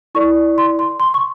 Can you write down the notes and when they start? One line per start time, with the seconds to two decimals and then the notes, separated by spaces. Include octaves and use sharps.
0.15 E4 A4 D5 C#6
0.58 C6
0.79 C6
1.00 C6
1.14 C#6